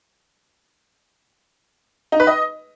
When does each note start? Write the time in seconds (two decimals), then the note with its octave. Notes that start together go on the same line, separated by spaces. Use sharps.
2.12 D#4
2.20 B4
2.27 D#5